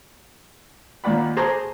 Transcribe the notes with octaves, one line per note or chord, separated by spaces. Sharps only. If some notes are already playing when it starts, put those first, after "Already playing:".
D#2 A#2 D5 F#5 B5
G#4 C5 A5 A#5 C6 D6